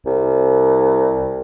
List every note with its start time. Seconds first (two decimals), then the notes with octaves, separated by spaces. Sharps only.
0.06 C2